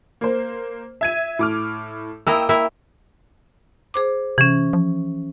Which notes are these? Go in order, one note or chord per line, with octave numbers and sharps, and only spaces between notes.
A#3 C5
E5 G#6 D#7
A2 D6 F6
A#3 E4 D#5 G5 E6
A#3 E4 E5
G#4 C5 D6
C3 E3 C#4
F3